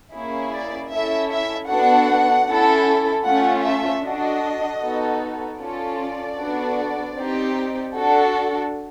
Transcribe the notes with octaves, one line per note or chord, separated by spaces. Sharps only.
A#3 C#4 E4 G#4
D5
C#4 E4 A4 E5
E5
B3 D4 F#4 A4 F#5
C#4 E4 A4
A3 C#4 F4 F#5
E5
D4 F#4 A4 D#5
B3 D#4 F#4 A4
C#4 F4 A4 D5
B3 D4 F#4 A4
C4 D#4 G4
D4 F#4 A4